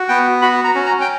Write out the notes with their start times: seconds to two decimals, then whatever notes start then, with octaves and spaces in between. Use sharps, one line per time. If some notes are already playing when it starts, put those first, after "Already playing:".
Already playing: F#4
0.09 B3 G5
0.42 F#4 B5
0.64 A#5
0.75 C#4
0.86 A#5
1.01 G5